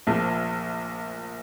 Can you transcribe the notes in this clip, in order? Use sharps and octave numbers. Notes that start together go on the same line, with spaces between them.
A#1 A#2 F3